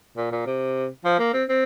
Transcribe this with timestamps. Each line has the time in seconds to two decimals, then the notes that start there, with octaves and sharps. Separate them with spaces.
0.17 A#2
0.32 A#2
0.46 C3
1.05 F3
1.19 A#3
1.34 C4
1.49 C4